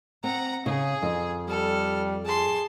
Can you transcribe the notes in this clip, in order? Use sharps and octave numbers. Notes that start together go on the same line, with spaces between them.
C4 F#5 A#5
C#3 G#4
F2
G3 A4 F6
G#4 A5 C6